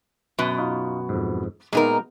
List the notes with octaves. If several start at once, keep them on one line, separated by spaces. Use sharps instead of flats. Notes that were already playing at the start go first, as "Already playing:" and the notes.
F#2 B2
D#4 F4
F2 G#2
A#2 G#3 B3 D#4 A#4